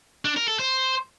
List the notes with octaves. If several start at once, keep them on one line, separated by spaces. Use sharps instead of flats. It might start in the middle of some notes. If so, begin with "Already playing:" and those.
D4
A#4
A4
C5